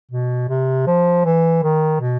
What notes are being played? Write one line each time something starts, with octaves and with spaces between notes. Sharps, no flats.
B2
C3
F3
E3
D#3
B2